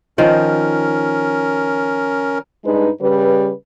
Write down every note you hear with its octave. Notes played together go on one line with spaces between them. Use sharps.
D#3 F3 C#4 A#4
G2 G#3 D4 D#4 B4
C#3 G3 B4